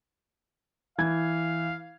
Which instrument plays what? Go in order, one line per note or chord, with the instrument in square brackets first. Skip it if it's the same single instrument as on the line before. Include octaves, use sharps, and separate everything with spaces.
[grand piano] E3 G#6 [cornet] F5